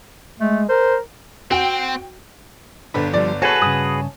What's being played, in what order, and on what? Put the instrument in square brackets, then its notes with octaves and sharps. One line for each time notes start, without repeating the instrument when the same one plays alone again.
[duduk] G#3 [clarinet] A3
[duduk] A#4 [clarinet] C5
[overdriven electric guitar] C4 [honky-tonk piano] F#4 G5
[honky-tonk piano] G1 D3 [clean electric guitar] D4 B4
[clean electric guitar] F3 G3 [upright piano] D5
[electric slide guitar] F#4 G#4 B4 [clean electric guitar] A4 [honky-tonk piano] C#5 G#5 A5
[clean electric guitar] G2 C#3 [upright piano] D#6